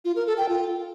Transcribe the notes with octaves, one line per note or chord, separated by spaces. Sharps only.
F4
A#4
A4
G5
F4